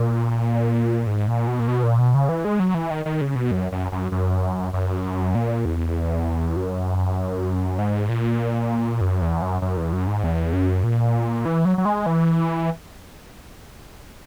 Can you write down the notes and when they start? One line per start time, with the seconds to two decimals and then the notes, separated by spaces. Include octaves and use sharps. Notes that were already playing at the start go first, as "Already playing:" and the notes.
Already playing: A#2
1.07 G#2
1.28 A#2
1.47 B2
1.60 A#2
1.68 B2
1.83 A#2
1.99 B2
2.14 C#3
2.29 E3
2.45 G#3
2.60 F#3
2.75 E3
2.90 D#3
3.05 D#3
3.21 C#3
3.36 B2
3.51 F#2
3.72 F#2
3.92 F#2
4.12 F#2
4.73 F#2
5.35 A#2
5.65 E2
6.56 F#2
7.78 G#2
8.09 A#2
9.01 F#2
9.22 E2
9.42 F#2
9.62 F#2
9.77 E2
9.93 F#2
10.07 G#2
10.24 E2
10.53 F#2
10.84 A#2
11.45 E3
11.65 F#3
11.78 F#3
11.85 G#3
12.06 E3